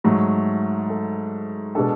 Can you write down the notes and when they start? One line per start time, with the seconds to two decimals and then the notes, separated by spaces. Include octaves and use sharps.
0.04 G#2 F#3 A3
0.90 A4
1.75 B2 G#3 D4 A4